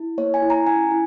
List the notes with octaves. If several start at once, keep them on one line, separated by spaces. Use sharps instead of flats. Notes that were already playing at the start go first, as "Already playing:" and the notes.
Already playing: E4
A#3 C#5
G#5
E4
A#5
C#4 G#5
E4